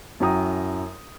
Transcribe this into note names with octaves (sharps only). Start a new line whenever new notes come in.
F#2 E4 F#4 G5 A#5 D#6